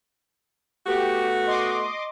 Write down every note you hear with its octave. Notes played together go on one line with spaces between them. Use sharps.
A3 B3 F#4 G4
D#5 C6 D6